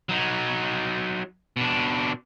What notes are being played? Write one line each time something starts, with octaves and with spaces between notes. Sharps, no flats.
F#3 D#4
B2 D4